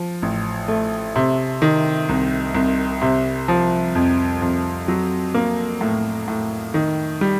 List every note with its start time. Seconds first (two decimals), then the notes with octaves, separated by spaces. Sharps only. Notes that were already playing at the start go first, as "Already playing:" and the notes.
Already playing: F3
0.22 A1
0.68 A3
1.16 C3
1.62 D#3
2.09 C2
2.54 C2
3.02 C3
3.48 F3
3.95 F2
4.42 F2
4.88 F#3
5.34 A#3
5.81 A2
6.28 A2
6.74 D#3
7.21 G3